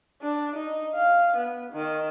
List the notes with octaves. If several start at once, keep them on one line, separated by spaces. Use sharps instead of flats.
D4
D#4
F5
B3
D#3